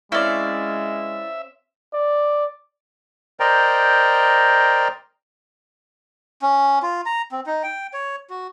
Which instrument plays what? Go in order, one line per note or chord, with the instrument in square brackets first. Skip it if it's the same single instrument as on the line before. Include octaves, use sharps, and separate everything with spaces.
[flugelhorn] G#3 [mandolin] C4 C#4 F5 [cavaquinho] E4 D5 [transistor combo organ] E5
[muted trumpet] D5
[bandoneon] A#4 C5 D5 D#5 G5 A#5
[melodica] C#4
F4
A#5
C4
D#4
G5
C#5
F#4